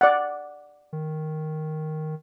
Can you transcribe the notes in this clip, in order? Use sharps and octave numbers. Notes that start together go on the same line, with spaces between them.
D5 F#5
D#3